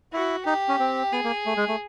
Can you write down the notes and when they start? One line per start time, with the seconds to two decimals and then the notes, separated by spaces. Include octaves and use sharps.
0.13 E4 F#4
0.46 D#4 G4
0.68 C#4
0.79 C4
1.13 B3 G#4
1.24 A#3
1.46 A3
1.57 G#3
1.68 A3